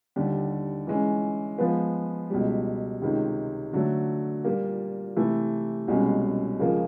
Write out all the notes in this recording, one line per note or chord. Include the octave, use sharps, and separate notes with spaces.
D#2 D3 G3
E3 G#3 C#4
F3 G#3 B3
C#2 B2 G3
C#2 C3 D#3
D3 F#3 A3
A#2 G3 A#3
C3 E3 A3
C2 B2 G#3 C#4
C#2 C#3 F3 A#3